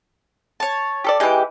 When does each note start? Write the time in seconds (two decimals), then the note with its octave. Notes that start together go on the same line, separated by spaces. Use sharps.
0.60 C#5 A5
1.04 G4 A4 D5
1.20 E3 G#3 G4 G5